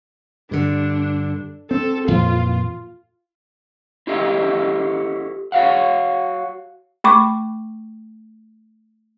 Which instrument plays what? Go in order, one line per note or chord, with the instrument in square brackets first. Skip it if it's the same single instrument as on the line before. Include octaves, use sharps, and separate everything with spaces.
[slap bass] G2 D3 [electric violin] D4
[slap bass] C4 [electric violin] A4
[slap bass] F2 A#2 E3 [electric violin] F4
[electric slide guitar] E4 F4 G4 A4 D#5 E5
F#4 C#5 F5 F#5
[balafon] A3 B5 C#6 D6